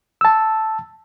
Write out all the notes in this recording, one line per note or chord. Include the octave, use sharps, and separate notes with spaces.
A5 E6